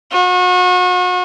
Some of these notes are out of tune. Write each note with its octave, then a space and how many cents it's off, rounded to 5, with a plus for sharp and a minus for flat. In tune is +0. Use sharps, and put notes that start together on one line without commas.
F#4 -35